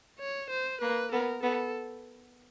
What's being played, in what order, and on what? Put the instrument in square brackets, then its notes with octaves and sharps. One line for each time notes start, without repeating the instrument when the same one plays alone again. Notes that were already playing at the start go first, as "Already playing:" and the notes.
[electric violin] C#5
C5
[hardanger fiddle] A#3 [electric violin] B4
[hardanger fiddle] B3 [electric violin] A#4
[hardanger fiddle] B3 [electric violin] A4